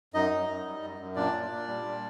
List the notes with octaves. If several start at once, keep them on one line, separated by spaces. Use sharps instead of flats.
F#2 D#4 D#5
F#2
F#2
G3
F#2
F#2
A#2 D4 D5
A#2
A#2
G3
A#2